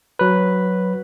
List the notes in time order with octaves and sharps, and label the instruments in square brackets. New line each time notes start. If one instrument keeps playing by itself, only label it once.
[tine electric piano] F#3 B4